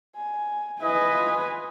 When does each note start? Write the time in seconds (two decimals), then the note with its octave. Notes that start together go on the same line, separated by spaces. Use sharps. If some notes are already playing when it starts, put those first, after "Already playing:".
0.16 G#5
0.82 E4 B4 D#5 G#5
1.14 F4